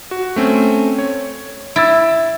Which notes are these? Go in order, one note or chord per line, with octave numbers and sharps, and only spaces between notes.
F#4
A3 C4 C#4
C#5
E4 E6 A6 D7